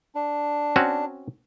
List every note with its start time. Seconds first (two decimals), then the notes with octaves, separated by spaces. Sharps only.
0.15 D4
0.76 C4 C#4 F#4